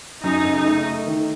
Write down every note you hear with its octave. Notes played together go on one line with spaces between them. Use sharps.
F#2 D#4
F#1
D#4
A3
A3
D#3